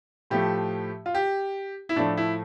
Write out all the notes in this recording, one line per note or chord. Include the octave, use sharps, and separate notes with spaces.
A2 F3 A3 G4
F4
G4
E4
A2 F3 A3 D4
E4